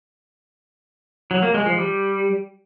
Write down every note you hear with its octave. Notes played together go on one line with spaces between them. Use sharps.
F#3
A#3
G#3
F3
G3